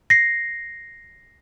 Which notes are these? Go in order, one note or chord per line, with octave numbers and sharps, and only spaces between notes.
A#6 C7